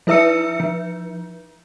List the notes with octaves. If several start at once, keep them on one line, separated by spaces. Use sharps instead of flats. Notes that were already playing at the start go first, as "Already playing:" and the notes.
F3 E4 B4 E5 E6 C#7
F3